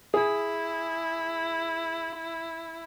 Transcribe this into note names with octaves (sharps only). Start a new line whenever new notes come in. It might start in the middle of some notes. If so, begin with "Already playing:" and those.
E4 G#4